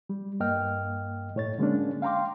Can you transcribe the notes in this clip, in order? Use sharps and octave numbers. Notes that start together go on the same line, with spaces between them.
G3
G2 A#3 D#5 G5 F6
A2 C#5 A6
D3 G#3 A#3 C#4 D4
F5 G5 A#5 C6 D6